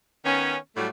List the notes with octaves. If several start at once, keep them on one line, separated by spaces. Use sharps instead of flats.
D#3 B3 C#4
A2 F#3 G3 A3